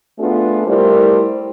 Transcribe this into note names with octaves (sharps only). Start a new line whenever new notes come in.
A3 B3 D4 F4 G#4 A4
G3 A3 E4 A#4 C5